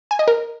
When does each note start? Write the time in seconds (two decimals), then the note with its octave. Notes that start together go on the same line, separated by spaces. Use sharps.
0.11 G#5
0.19 D#5
0.28 A#4